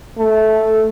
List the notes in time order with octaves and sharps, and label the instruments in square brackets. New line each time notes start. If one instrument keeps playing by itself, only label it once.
[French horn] A3